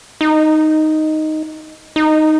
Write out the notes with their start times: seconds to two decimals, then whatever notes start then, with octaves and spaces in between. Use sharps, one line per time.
0.21 D#4
1.96 D#4